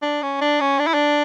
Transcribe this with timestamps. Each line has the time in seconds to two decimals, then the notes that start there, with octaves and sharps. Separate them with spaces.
0.02 D4
0.22 C#4
0.41 D4
0.61 C#4
0.79 D4
0.87 E4
0.94 D4